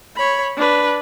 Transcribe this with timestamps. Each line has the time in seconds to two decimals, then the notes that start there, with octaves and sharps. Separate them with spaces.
0.16 C#5 B5
0.56 D4 B4